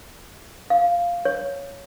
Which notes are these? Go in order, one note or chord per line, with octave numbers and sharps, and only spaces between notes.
F5
C#5